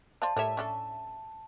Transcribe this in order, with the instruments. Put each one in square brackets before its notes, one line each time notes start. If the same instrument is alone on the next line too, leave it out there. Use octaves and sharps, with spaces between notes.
[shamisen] C5 D5 F5 [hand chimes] A5
[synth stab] A2 E5 [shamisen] G3 A#4 C#5
[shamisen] C#4 D4 A4